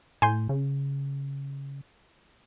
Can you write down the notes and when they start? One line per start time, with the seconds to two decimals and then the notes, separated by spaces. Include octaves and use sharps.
0.22 A2 G#5 C6 G6
0.49 C#3